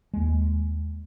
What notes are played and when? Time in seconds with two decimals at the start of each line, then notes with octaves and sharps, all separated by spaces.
0.14 D#2 G#3